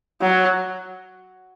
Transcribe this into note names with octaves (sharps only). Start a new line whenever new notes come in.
F#3